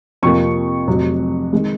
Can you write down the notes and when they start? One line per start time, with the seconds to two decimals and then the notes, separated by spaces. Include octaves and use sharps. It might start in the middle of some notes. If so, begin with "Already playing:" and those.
0.23 F2 C3 F3 A#3 C#6
0.87 F1 F2 C3 F#3
1.53 D#3 G#3